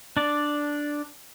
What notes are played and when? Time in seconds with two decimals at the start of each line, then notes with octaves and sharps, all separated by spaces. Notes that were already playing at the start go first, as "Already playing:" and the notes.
0.17 D4 D5